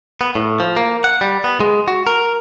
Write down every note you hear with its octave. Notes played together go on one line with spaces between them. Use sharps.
B3
A2
F3
A#3
F#5
G3
B3
G#3
F#4
A#4